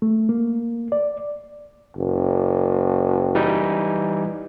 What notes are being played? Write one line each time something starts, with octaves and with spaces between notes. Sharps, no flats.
A3
A#3
D5
F#1
E3 G3 D#4